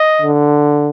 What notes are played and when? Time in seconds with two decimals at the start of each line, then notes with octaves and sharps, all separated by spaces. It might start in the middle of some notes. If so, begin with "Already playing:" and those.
Already playing: D#5
0.22 D3